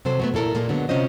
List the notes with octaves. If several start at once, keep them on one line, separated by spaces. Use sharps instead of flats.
C3 F#3 A4 C5
F#3 A3 B3
A#2 E4 A4 A#4
A#2 G#3 A#3
D3 F#3 G#3 B3
C3 F#3 C#4 F4 C5 D#5